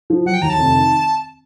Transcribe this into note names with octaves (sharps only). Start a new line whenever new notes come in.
F3
F#3 F#5
G5
D#2 A#5
A5
F1
D#3